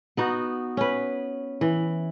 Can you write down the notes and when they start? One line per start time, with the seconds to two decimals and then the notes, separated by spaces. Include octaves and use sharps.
0.17 B3 D#4 F#4
0.77 C#4 B4
1.61 E3